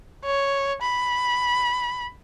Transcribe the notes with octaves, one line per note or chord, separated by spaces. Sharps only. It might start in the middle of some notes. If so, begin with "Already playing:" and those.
C#5
B5